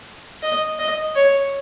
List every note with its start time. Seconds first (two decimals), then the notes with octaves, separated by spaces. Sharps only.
0.43 D#5
0.79 D#5
1.15 C#5